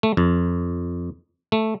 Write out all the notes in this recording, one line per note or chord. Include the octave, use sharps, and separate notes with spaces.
A3
F2
A3